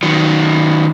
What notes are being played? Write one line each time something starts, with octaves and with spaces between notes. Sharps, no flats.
D#3 F#3